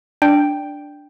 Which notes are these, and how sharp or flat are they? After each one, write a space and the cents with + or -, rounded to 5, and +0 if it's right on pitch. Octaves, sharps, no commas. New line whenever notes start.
D4 +0 G5 +0